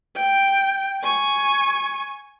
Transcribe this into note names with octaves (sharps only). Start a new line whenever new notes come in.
G5
G#5 C#6